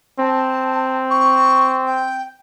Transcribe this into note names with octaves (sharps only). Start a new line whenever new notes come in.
C4 A5
C#6
G5